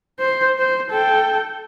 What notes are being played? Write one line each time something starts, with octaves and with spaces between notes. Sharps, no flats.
C5
C5
A4 G5